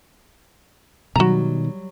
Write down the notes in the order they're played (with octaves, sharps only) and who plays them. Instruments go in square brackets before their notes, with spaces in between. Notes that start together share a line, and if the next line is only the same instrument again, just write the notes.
[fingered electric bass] B2 D#3 [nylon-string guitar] F#3 G3 [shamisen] F#4 A#5